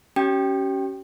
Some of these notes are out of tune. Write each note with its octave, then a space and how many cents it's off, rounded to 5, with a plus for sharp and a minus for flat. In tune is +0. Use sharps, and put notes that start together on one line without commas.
C#4 +0 G4 -40 G5 +0